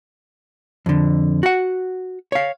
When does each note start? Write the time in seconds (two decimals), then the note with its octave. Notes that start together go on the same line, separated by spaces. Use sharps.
0.86 F2 D3
1.43 F#4 F#5
2.32 C#5 F5